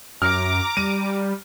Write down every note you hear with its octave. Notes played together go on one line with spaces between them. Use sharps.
F#2 A#5 D6 F6
G3 D#7